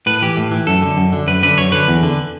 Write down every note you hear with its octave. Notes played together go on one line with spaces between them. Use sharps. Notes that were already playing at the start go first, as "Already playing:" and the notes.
A2 B4
E3 G4
A2
E3
F#2 A4
D3
F#2
D3
F#2 B4
D3 B4
F#2 C#5
D3 B4
E2
D3